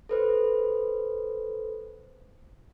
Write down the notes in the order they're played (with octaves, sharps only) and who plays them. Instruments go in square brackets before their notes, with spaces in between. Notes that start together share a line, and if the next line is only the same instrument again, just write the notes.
[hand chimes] A4 B4 C5